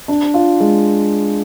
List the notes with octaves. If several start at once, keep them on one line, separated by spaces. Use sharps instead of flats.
D4
F4
G#3